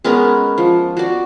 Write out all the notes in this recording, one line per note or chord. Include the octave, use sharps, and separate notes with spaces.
G#3 B3 C#4 A#4
F3
F#4 D5